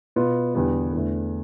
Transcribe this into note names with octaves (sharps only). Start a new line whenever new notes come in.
B2 B3 F4
E2 D3 G3 B3
E2 D3 A3